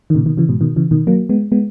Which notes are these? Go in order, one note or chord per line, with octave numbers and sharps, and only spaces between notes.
D#3
A#2 C#3
B2 D#3
C#3 E3
G#2 B2
B2 D#3
C#3 E3
B2 D#3
F#3 A#3
G#3 B3
G#3 B3